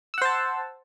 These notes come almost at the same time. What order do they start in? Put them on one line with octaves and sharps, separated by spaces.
E6 F#5 C5 A5